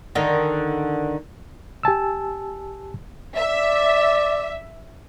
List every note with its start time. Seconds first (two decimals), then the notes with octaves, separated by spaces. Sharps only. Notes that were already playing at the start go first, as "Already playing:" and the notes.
0.15 D3 D#3
1.83 G4 G#5 A5 E6
3.37 D5 E5